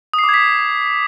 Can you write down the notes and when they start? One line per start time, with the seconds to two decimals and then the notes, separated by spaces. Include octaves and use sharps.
0.13 D#6
0.19 C7
0.24 D6
0.29 G#6
0.34 B6